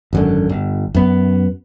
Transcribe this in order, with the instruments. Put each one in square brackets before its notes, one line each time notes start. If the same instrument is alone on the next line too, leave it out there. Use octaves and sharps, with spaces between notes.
[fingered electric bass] G#1 F#2 D3
G1
F#2 B3